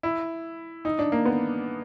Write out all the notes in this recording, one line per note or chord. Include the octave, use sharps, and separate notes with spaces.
E4
D#4
D4
A#3
B3